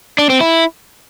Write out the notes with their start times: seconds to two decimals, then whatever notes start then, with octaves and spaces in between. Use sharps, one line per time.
0.19 D4
0.30 C4
0.41 E4